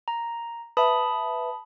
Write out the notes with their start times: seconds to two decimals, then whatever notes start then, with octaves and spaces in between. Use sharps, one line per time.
0.08 A#5
0.77 B4 E5 A5 B5 D#6